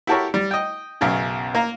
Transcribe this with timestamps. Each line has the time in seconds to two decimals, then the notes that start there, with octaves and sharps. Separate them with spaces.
0.07 E4 F#4 G4 A4 A#4 C#5
0.34 G3
0.51 D#5 G5
1.01 B1 F#2 C#3
1.55 A#3 A#5